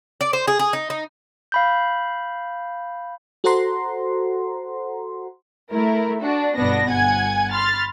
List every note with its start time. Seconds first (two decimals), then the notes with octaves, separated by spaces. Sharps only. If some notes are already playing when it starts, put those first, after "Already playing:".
0.21 D5
0.33 C5
0.48 G#4
0.59 G#4
0.73 D#4
0.90 D#4
1.52 F5 B5 G6
3.44 F#4 A4 C5 F#5 A#5 C6
5.70 A3 E4 A#4
6.21 D4 F#4
6.56 G1 B2 B3 D4 A#6
6.89 G1 F#5 G#5 G#6
7.52 B5 C6 F6 A6